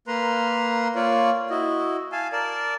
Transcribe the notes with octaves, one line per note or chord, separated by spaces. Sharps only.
A#3 B4 A#5 C6
A#3 F4 C#5 D5
E4 F#4 D#5
F5 G#5 A5
A#4 D5 A5